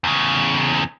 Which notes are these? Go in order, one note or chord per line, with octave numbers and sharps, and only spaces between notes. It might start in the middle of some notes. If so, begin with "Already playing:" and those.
E2 C#3